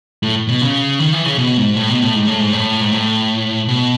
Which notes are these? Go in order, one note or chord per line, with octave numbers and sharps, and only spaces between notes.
A2
B2
C#3
D#3
E3
C#3
B2
G#2
A2
B2
A2
G#2
A2
G#2
A2
G#2
A2
B2